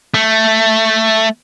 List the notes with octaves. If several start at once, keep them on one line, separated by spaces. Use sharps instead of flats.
A3